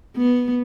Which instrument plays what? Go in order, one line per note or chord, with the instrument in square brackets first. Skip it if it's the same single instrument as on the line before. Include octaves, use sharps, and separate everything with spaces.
[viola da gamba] B3